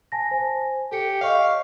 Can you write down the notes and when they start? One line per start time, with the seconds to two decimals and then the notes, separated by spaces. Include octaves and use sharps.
0.12 G#5 A5 A#6
0.31 C5 G#5
0.92 G4 A4 C#7
1.21 C#5 D#5 F5 C#6